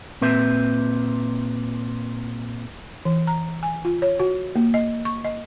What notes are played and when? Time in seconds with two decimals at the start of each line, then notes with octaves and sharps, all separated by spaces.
0.21 A#2 C4 B4 E5
3.05 E3
3.27 A#5
3.63 G#5
3.85 F4
4.02 C#5
4.20 F#4
4.56 A#3
4.74 D#5
5.05 C#6
5.24 D#5